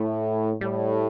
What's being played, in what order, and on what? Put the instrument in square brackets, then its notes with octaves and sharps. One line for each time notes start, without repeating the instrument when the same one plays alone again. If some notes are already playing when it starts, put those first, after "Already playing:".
Already playing: [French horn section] A2 [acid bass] A3
[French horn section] A2 [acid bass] G3